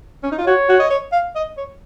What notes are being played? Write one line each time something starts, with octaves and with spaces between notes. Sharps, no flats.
C#4
D#4
F4
F#4 C#5
F#4
D#5
C#5
F5
D#5
C#5